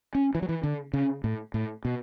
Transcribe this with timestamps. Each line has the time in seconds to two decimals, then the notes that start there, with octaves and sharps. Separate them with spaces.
0.15 C#4
0.35 E3
0.42 F#3
0.49 E3
0.63 D3
0.93 C#3
1.24 A2
1.54 A2
1.85 B2